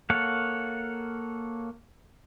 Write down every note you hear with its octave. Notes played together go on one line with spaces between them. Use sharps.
A#3 A4 C#5 F5 F#5